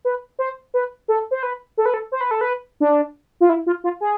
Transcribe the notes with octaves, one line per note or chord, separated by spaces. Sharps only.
B4
C5
B4
A4
C5
B4
A4
B4
A4
C5
B4
A4
B4
D4
F4
E4
F4
F4
G#4